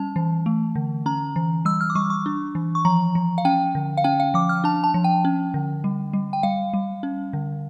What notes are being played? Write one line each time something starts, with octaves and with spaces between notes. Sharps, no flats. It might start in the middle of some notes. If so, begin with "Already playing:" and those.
Already playing: G3 C#4 A5
E3
A3
D3
C#4 A#5
E3
G3 E6
F6
D6
G3 C#6
C#6
D4
E3
C#6
F3 A#5
F3
F5
C#4 G5
D3
F5
C#4 G5
F5
F3 D6
F6
D4 A5
A5
F3
G5
C#4
D3
G3
G3
G5
G3 F5
G3
C#4
D3